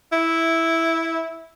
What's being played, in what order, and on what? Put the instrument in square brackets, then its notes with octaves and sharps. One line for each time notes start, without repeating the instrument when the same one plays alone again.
[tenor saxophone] E4